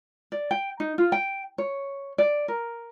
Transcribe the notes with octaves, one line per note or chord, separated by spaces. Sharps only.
D5
G5
D#4
F4
G5
C#5
D5
A#4